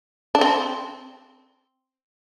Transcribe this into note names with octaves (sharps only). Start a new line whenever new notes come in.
D4
C4